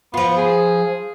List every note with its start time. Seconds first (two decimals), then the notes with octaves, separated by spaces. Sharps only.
0.14 F3 B3 F4
0.37 G#4